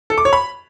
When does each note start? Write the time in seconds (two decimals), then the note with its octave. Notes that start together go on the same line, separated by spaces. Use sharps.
0.10 A4
0.18 D6
0.25 C#5
0.33 B5